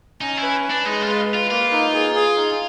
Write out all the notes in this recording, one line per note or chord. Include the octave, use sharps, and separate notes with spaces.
C#4 D#4
E4
B4
B4
D4
G#3 D#4
F4
B4
B4
F4
A#3 F4
D#4
G#4
G#4
D#4